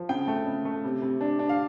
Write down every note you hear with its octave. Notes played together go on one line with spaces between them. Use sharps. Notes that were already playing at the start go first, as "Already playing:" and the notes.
Already playing: F3
C#3 G5
A3
C#3
A3
C3
C3
D4
D4
F5